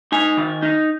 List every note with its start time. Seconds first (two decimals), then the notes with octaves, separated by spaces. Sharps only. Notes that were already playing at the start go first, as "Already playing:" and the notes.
0.12 D#4 G#5
0.37 D#3
0.62 D#4